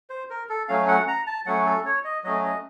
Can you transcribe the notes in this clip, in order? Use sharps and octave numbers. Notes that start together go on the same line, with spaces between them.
C5
A#4
A4
F#3 A3 C#4 F5
F#5
A#5
A5
F#3 A3 C#4 F#5
A4
C#5
D#5
F#3 A3 C#4 D#5
D#5